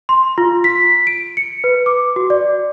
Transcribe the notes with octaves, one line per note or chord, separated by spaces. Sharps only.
C6
F4
B6
D7
C#7
B4
D6
F#4
D5